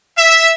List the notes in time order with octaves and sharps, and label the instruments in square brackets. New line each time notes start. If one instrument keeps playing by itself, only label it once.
[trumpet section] E5